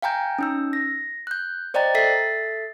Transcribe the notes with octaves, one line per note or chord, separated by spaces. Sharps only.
F5 G5 G#5 A#5 G6
C#4 D#4 E6
A#6
F#6 G6
C5 D5 D#5 G5 A#5 A6
A4 E5 A6 B6 C7